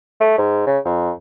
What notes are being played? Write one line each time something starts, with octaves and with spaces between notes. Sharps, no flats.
A3
G#2
C#3
F2